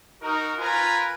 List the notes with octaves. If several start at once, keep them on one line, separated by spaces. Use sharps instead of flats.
D#4 F#4 A#4
F4 A#4 B4 G#5 A#5 B5